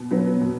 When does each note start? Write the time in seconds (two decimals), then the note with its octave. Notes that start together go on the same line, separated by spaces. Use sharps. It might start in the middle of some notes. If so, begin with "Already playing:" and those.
Already playing: B2
0.11 F#3 B3
0.41 B2